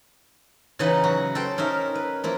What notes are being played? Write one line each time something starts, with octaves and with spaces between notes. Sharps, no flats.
C#3 E3 C#4 D#4 B4 F#5
F#3 F#4
A4 C5 G5
C#4 D#4 A#4 E5
B4
F3 A#3 E4